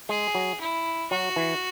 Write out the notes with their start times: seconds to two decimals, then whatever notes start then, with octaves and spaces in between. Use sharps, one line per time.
0.09 G#3 G#4
0.35 F#3
0.60 E4
1.11 F#3 F#4
1.36 E3